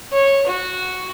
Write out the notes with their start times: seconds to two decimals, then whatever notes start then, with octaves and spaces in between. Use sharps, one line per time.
0.13 C#5
0.47 F#4